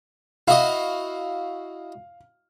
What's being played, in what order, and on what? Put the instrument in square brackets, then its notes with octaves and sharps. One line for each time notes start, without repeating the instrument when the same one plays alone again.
[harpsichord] E4 F#4 D#5 [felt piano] F5